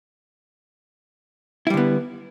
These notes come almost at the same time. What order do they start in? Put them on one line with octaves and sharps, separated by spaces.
E4 G3 D3 B3